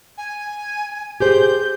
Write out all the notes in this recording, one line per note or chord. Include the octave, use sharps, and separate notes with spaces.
G#5
G4 G#4 C5 G6